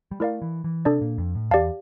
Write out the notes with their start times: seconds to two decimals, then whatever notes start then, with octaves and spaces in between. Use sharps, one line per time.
0.11 G3
0.20 A3 E4 A#4 D5 F5
0.42 E3
0.64 E3
0.85 C3 D4 A4 D5
1.01 A#2
1.18 F2
1.35 A2
1.50 E2 G4 D5 F5 A5